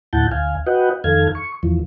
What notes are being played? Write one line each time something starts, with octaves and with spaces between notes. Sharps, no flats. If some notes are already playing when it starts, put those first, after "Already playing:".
D2 A2 E4 F#5 A5 G6
D2 F5 G#5
F#4 B4 D#5 F#5 G5
F2 D#3 A4 F5 G#6
C#6
E2 E3 F3